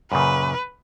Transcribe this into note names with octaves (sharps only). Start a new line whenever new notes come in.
F#2 A#2 C#3 B4